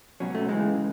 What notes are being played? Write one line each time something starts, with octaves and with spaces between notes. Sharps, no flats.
C#2 B2 F#3 C#4
A3
C#2 C#3 E3 G#3